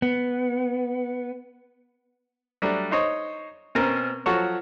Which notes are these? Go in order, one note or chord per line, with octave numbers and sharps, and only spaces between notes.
B3
F#3 G3 A3 D4
D#4 C5 C#5 D#5
B2 C4 C#4 A#4 A#5
F3 F#3 F#4 A4 C#5